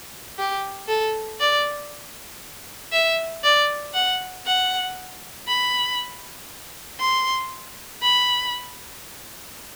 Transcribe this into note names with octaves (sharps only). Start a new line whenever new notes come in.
G4
A4
D5
E5
D5
F#5
F#5
B5
C6
B5